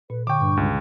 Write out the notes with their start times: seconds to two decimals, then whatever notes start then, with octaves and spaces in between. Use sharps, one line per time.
0.10 A#2 B4
0.27 D3 G5 C#6 D6
0.39 G2
0.57 C#2